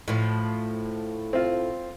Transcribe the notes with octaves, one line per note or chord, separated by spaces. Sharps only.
A2 F3
C4 F4